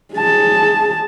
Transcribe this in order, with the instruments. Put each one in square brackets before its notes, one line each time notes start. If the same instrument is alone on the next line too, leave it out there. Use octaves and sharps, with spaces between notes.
[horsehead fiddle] G#4 A5